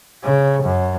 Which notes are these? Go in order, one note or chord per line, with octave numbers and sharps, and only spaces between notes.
C#3
F#2